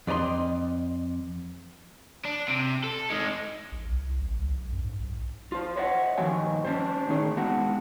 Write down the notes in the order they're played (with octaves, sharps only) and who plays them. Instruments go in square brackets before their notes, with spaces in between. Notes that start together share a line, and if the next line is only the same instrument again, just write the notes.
[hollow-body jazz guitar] F2 D5 D#5 A#5 C6
[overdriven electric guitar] D4
C3
A4
D#3 G#3
[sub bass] A#1
C2
C2
A1
C#2
B1
F#2
G#2
B1
[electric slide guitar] F4 C5
C5 C#5 D#5 E5 F#5
G2 D#3 F3 F#4 D#5 G#5
C#4 D4 C5
A2 D#3 D#4 G#4
G#3 B3 D4 F#4 F#5